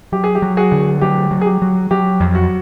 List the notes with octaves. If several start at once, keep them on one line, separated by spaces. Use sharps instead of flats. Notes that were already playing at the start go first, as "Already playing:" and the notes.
F#3 G4
G#4
G4
F#3
F#4 G#4
D3
F#3 G4
F#3
G#4
G4
F#3
F#3 G4
F2
F#4